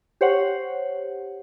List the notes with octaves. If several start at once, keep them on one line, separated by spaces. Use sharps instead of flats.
G4 C5 C#5 F#5